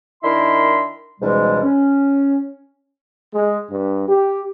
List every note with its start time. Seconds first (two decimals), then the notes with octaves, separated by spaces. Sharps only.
0.24 D#3 D4 E4 A#4 E5 C6
1.20 C#2 G#2 B2 E3 G3 G#3
1.63 C#4
3.34 G#3
3.70 G2
4.08 G4